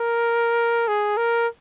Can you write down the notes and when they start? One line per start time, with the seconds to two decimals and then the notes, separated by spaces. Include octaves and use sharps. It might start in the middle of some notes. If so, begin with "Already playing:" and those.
Already playing: A#4
0.88 G#4
1.17 A#4